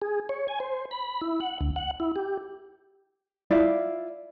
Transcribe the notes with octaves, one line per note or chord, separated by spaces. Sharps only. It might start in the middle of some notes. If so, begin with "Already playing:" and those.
G#4
C#5
G#5
C5
B5
E4
F#5
D2
F#5
E4
G4
E4 F4 D5 F5